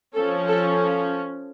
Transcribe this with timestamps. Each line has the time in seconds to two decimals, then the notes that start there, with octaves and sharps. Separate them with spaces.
0.15 F3 C#4 A4
0.48 A4